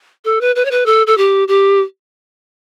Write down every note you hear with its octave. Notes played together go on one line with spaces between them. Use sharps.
A4
B4
B4
C#5
B4
A4
A4
G4
G4